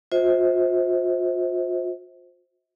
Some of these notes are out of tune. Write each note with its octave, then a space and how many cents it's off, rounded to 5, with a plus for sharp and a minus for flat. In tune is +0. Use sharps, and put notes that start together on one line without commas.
F4 +40 C5 +0 E5 -45